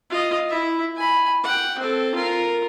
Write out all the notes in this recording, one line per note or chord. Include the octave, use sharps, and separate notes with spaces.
F4 D#5
E4 E5
G#5 B5
F#5 G5
C4 A4
F4 A#4